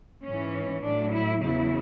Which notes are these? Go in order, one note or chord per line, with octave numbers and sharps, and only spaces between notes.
G#2 E3 C#4
A2 F#3 D4
E4
E2 C#3 F#3 E4